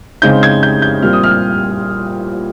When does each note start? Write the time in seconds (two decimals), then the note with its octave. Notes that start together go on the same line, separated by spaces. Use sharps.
0.22 C#3 G#3 C4 D#4 G6
0.43 G#6
0.63 G6
0.82 G6
1.02 A#2 G3 C4 F6
1.13 D#6
1.23 F6